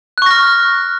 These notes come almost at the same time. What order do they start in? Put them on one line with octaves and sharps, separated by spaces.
F#6 C#6 A#6 F6